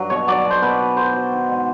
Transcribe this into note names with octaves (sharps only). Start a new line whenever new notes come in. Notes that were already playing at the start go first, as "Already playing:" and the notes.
Already playing: G2 F#3
B2 C#5
F#3 D5
B2
C5
B2 B4
B2
F#3 C5
F#3
D#3
G#2